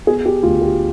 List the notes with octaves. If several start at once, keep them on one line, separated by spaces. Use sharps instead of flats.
B3 G#4
G4
D2 F4
G4